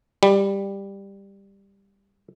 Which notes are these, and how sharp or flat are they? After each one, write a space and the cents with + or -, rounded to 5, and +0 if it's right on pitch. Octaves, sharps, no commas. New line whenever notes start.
G3 +10